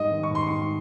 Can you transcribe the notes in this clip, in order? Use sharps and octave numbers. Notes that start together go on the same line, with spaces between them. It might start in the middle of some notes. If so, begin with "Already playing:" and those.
Already playing: G#2 G3 D#5
D#3
C#6
G#2 C6
G#2 C#6